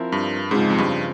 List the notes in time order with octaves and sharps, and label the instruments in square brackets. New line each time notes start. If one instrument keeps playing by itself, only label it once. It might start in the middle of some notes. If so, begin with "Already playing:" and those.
Already playing: [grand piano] F3 C4 E4 A#4
[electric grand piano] G2
[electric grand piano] G#2 [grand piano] C#3 F3 G#3 C4
[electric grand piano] F2
G2